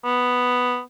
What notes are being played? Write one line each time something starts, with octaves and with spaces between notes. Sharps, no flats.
B3